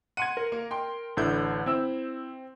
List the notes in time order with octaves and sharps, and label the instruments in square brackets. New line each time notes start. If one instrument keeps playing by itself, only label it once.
[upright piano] F#5 C6 G#6 [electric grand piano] D#7
[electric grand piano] A#4
[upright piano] A#3
G5 C6
[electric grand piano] A1 D3 G6 [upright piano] D4 E4
[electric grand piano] C4 [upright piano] E4 E6